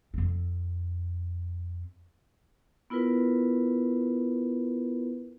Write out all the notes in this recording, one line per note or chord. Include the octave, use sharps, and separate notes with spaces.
F2 C4
B3 E4 F4 A#4 B4